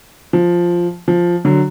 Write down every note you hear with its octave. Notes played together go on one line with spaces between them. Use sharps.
F3
F3
D3 F#3